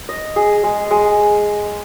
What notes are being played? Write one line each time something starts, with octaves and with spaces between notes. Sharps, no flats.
D#5
G#4
G#3
G#3